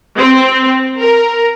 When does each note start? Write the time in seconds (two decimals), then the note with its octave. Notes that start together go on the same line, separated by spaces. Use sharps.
0.17 C4
0.98 A#4